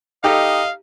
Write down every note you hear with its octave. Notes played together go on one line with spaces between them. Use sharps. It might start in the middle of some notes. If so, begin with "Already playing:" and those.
D#4 G4 A4 D#5 F5